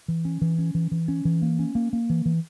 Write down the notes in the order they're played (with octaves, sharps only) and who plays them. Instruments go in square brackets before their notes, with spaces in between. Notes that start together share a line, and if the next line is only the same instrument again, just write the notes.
[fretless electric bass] E3
C#4
E3
C#4
E3
E3
C#4
E3
A#3
C#4
A#3
A#3
E3
E3